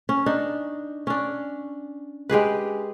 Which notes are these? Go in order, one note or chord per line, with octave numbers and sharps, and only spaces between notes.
C#4
D4 D#4
C#4 D4
G#3 G4 G#4 B4